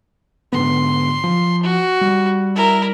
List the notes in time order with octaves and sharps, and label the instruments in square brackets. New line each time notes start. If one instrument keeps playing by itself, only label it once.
[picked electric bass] G#2 D3 B3 [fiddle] C6
[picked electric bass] F3
[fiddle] F#4
[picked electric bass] G3
[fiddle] E4 A#4